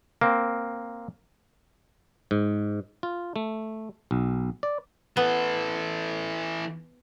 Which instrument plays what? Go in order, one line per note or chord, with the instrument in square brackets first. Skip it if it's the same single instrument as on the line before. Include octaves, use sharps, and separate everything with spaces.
[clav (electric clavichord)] A#3 C4
G#2
F4
A3
B1
D5
[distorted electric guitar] E3 A4 [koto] B3